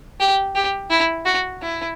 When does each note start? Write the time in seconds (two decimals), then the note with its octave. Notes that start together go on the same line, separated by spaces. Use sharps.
0.20 G4
0.55 G4
0.90 E4
1.26 F#4
1.62 E4